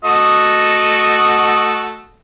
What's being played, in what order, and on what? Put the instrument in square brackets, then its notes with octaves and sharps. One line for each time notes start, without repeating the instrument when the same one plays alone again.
[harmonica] A3 F#4 D#5